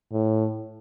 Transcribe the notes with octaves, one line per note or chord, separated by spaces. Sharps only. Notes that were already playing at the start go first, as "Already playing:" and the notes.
A2